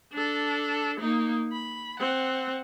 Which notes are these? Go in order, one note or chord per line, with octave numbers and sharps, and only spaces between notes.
D4 A4
A#3 D#4
B5
C4 F#5